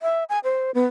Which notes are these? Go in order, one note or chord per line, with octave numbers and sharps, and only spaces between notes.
E5
G#5
C5
B3